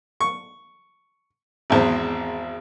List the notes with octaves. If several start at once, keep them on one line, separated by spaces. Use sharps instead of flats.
C#6
G#1 E2 C4